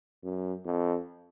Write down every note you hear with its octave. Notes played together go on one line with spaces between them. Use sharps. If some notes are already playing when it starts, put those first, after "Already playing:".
F#2
F2